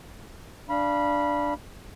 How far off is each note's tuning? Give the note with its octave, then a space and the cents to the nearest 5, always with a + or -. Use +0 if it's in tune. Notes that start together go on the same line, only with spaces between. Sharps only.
D4 +0 F5 -20 B5 -20